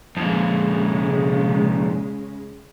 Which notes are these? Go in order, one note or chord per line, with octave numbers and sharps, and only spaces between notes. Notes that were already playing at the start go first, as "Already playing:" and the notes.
F2 A#2 C#3 G#3